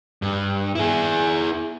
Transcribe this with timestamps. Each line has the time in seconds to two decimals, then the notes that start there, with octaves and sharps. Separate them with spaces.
0.22 G2
0.75 E4 G#4